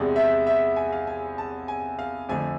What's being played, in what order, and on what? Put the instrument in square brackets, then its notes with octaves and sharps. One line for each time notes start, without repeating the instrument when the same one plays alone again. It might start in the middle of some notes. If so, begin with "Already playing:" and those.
Already playing: [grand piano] E2 C3 G#3 D5
E5
E5
G#5
F5
G#5
A5
G#5
F5
F2 D3 A3 G#5